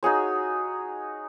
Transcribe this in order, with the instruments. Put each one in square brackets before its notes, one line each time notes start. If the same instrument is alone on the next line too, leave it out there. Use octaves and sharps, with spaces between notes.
[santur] D#4 F#4 G#4 C#5